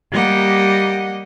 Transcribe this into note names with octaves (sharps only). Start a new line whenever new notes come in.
G3 A#3 G4 D#5 F#5